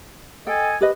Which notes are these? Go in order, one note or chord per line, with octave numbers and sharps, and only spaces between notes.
A4 D#5 G5 G#5
G4 B4 D#5